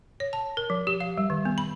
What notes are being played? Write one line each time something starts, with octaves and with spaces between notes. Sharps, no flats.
C#5
A5
A#4
F3
G4
F5
G3
D#3
B3
B5